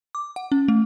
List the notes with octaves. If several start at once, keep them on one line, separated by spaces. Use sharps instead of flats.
D6
F#5
C#4
A3